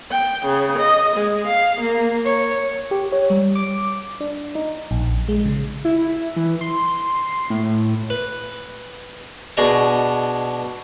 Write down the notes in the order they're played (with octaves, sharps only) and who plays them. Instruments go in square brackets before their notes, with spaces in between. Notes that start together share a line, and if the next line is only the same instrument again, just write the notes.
[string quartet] G5
C#3
D#5
G#3
F5
A#3
C#5
[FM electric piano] G4
C#5
G3
D6
D4
D#4
A#1
G#3
C#3
[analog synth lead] E4
E3
C6
A2
[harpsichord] B4
B2 D4 G#4 D#5 G#5